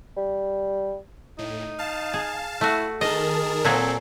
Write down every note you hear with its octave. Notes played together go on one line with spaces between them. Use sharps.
G3
A2 D#4
F5 A5
G#4
A3 E4 F#4
D#3 G#4 A#4 D#5 A5
A#2 F#3 C4 G#4 A4